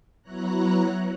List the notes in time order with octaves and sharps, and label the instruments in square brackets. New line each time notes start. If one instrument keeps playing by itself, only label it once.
[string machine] F#3 B3 E4 C#5 A#5 F#6